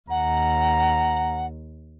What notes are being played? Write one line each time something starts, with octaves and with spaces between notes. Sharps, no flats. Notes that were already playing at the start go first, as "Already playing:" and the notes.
D#2 F#5 A#5